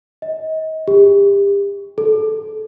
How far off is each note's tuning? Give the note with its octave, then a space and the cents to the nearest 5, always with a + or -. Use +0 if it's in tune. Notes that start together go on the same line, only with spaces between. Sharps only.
D#5 +30
G4 +35
A4 -15